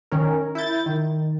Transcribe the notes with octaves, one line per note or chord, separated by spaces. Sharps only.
D#3 C#4 A#4
E4 G6 A6
D#3